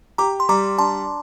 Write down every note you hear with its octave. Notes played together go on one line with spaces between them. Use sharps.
G4 A#5 D6
C6
G3 A#5 D6
D4 A5 C6